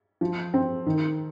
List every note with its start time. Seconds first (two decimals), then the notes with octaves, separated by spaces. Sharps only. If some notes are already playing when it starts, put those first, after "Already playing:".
0.21 F3
0.54 C4
0.86 D#3